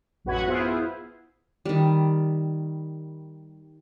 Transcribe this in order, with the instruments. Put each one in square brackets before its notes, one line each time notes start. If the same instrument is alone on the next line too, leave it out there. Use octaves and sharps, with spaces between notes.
[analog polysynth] A1 F#2 F#4 B4 F#5 G#6
B3 E4 F4 G#4 C5
[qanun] D#3 G3